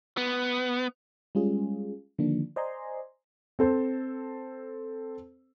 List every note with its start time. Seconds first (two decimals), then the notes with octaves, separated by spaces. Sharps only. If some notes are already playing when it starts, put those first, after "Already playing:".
0.17 B3
1.35 G3 G#3 C#4 F4 G#4
2.19 D3 D#3 F3 A#3 D4
2.56 C5 D5 D#5 G#5 A#5 C6
3.59 C4 A4 C5